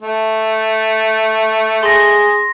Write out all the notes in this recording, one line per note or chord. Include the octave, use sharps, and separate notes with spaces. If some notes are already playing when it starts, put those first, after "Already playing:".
A3
G#4 C6 A#6